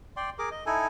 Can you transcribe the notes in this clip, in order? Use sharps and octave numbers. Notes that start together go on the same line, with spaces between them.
D5 G5 C6
G#4 A#4 D6
D#5
D#4 E4 A4 G#5